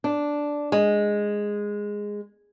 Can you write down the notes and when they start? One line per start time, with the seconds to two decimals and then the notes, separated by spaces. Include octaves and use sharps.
0.04 D4
0.72 G#3